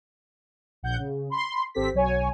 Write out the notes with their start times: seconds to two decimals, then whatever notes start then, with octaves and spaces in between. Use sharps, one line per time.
0.83 A#1 F#5 G6
0.98 C#3
1.30 B5 C6
1.74 G#1 C4 G4 A4 B6
1.93 B1 F#3 C#5 G#5